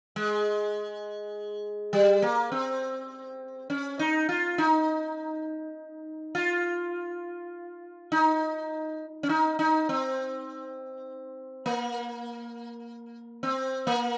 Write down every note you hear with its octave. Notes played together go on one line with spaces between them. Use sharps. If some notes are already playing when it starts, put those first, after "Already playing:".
G#3
G3
A#3
C4
C#4
D#4
F4
D#4
F4
D#4
C#4
D#4
D#4
C4
A#3
C4
A#3